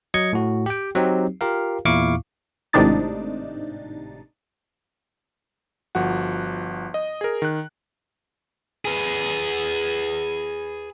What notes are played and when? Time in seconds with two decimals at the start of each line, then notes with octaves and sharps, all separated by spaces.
0.14 F#3 D#5 G#6 C#7
0.33 A2 F#4
0.66 G4 G5
0.95 F#3 C4 D#4 G4
1.41 F4 G4 A#4 F5
1.85 E2 A#2 E4 F5 C#6 D6
2.73 G#1 A2 C3 D4 D#4 A6
5.95 G1 F3 F#4 F#5
6.94 D#5
7.21 G#4 A#4
7.42 D#3 F#6
8.85 G#4 B4